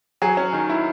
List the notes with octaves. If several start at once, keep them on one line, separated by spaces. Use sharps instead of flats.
F#3 G#4
C#4
D#3
E4